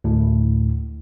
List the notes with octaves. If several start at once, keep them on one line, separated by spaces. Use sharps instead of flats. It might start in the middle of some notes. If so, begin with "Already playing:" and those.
D2 A2